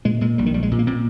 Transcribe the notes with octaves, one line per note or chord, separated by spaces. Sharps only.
A#2 G#3
A#2 G#3
A#1 G3
D#3
A#1 G3
G#3
A#2
A#3
A#2 C4